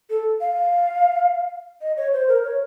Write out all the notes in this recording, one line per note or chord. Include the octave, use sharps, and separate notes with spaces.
A4
F5
D#5
C#5
C5
A#4
C#5